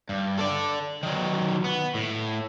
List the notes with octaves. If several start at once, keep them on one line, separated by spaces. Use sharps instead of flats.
G2
A4 D5
D#3 F#3
B3
A2